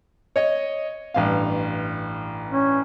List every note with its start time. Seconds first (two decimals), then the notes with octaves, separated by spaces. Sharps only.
0.36 C#5 D#5
1.14 A1 G2 F5
2.51 C#4